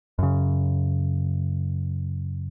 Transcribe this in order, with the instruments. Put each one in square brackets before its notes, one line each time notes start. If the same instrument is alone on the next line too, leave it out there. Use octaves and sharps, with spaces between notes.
[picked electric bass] F#2 C#3